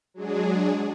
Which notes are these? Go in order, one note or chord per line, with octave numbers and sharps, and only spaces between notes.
F#3 G#3 D4 G#4